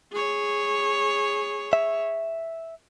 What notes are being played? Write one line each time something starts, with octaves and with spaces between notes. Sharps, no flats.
G#4 C#5
E5